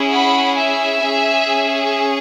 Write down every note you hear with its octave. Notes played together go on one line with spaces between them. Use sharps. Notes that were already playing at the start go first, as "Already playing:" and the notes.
Already playing: C#4 E4 G#4
F#5 B5
E5 G#5
C#4 G#4